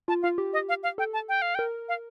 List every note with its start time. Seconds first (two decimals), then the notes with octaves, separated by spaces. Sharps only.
0.08 F4 A5
0.23 F4 F5
0.38 G4
0.53 D#5
0.69 F5
0.83 F5
0.98 A4 G5
1.13 A5
1.29 G5
1.42 F5
1.55 A#4 G5
1.89 F5